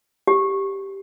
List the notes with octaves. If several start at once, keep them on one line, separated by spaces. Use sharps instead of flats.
G4